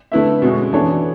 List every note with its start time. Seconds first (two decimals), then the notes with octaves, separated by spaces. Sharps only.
0.12 D3 A3 E4 B4 E5
0.42 B2 G#3 C#4 F#4
0.73 E3 B3 D4 A4 C#5